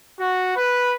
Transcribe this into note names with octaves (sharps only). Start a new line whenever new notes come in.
F#4
B4